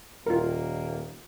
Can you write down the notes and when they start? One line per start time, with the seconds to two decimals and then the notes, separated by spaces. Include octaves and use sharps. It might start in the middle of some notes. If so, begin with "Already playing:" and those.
0.26 D#1 A#3 F4 A#4